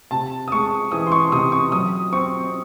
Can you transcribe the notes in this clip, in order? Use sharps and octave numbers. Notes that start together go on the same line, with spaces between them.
C3 A5
D#6
G#3 C#6
E3 D#6
C6
C#6
C3 D#6
C#6
F#3 D#6
C4 C#6